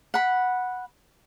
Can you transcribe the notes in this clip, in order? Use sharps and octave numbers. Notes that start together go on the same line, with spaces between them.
F#5 B5